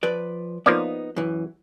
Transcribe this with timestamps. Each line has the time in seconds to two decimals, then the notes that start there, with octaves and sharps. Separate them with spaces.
0.03 F3 B4 D5
0.66 F3 A#3 B3 D#4 D5
1.16 F#2 E3